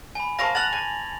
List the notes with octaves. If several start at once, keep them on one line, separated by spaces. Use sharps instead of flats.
G#5 B5
A#4 C5 F5 A5 C#6 A#6
F#5 F6 A6 F7 F#7
G#5